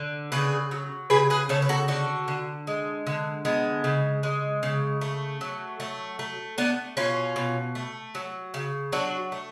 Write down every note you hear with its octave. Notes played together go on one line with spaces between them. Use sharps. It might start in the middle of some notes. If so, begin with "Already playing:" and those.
Already playing: D3
C#3 G#4 B4
F#3
C#3 G#4 B4
G#4 B4
C#3 A4 C#5
B4
F#4 A4
D3 F#4 A4
D3
G#3
D3
G#3 B3
C#3
G#3
C#3
A3
F#3
A3
A3
A3 B3 D4
B2 C#4 F4
B2
A3
F#3
C#3
F#3 D4 F#4
A3